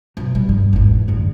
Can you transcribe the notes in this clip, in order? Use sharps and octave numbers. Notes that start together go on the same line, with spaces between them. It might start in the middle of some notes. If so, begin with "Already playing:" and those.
B2 F#3
G3
G2
G#1 E2
F#2 D3